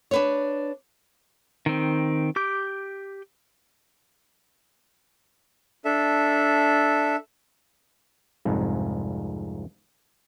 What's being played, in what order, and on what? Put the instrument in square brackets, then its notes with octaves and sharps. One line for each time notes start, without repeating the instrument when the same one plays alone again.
[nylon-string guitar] D4 B4 C#5
[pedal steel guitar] D#3 C4
G4 D6 G6
[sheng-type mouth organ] D4 A4 E5
[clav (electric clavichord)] C2 F2 G#2